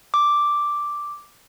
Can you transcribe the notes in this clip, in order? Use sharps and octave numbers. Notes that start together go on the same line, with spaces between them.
D6